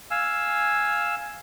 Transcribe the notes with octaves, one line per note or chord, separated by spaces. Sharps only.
F5 G#5 E6